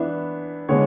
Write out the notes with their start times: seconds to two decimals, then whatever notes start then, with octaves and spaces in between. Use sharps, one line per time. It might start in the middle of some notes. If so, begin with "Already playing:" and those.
Already playing: E3 B3 D4 E5
0.69 D3 G#3 B3 C#5